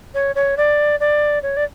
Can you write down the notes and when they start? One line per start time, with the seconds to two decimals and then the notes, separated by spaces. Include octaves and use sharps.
0.14 C#5
0.35 C#5
0.57 D5
1.00 D5
1.43 C#5
1.57 D5